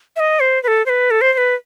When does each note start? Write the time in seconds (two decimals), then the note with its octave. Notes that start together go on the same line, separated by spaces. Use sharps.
0.16 E5
0.20 D#5
0.40 C5
0.63 B4
0.68 A4
0.86 C5
0.89 B4
1.11 A4
1.21 C5
1.33 C5
1.38 B4